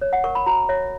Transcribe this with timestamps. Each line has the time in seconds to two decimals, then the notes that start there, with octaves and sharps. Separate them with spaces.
0.01 C#5
0.13 F#5
0.24 A#4 C#6
0.35 B5
0.46 F#4 A#5
0.69 C#5 E5